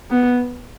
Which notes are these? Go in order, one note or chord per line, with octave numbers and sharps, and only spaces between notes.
B3